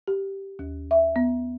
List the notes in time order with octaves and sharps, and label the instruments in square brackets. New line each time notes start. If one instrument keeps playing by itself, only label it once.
[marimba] G4
D#2
E5
B3